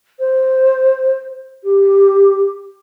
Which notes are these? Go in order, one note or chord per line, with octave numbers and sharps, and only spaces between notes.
C5
G4